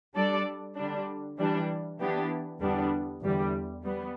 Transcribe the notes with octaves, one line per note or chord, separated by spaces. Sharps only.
G3 D4 A4 D5
D3 G3 D4
E3 G3 D4
E3 B3 D4 G4
E2 D3 G3 B3 D4
E2 D3 G3
G3 B3